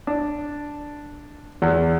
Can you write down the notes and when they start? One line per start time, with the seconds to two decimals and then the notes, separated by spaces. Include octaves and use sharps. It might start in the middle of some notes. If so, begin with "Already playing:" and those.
0.07 D4
1.62 E2